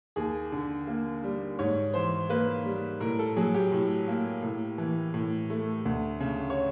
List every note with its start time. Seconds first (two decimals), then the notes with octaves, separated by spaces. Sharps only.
0.16 D#2 G#4
0.52 D3
0.87 A#3
1.24 G3
1.59 G#2 C#5
1.94 E3 C5
2.29 A#3 B4
2.65 G3
3.00 A2 A#4
3.19 A4
3.37 F#3 G#4
3.55 G4
3.72 A2
4.08 A#3
4.43 A2
4.78 E3
5.14 A2
5.50 A3
5.85 D2
6.20 C#3
6.50 C#5